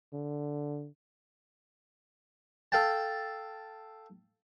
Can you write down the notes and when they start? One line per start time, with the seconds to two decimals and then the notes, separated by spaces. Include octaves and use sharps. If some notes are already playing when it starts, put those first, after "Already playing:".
0.13 D3
2.72 A4 F5 G5 A5